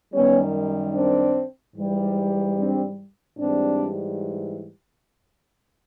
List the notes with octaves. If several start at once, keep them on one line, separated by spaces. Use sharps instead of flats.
F#2 D#3 G3 B3 C#4
C4 D4
G#2 E3 G3
C4 D4
G#2 E3 G3 C4 D4